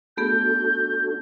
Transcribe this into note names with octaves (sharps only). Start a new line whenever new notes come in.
A3 B3 D4 F#4 G#4 A4 G6